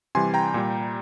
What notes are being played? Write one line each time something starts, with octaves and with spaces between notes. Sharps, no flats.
C3 E3 G3 G#5 C6
G5 A#5
A#2 G3